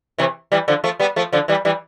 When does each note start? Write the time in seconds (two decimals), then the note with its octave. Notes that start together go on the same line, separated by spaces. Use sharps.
0.18 C3 E3
0.52 E3 G3
0.68 D3 F3
0.84 F3 A3
1.00 G3 B3
1.16 F3 A3
1.32 D3 F3
1.48 E3 G3
1.65 E3 G3